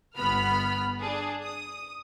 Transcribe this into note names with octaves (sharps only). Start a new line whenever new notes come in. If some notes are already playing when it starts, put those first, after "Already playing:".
G1 B3 B5 F6
D4 G#4
D#6